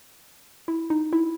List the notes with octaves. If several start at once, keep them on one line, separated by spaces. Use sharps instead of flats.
E4
D#4
E4